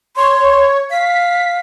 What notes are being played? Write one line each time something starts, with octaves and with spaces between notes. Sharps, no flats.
C#5 C6
F5 B6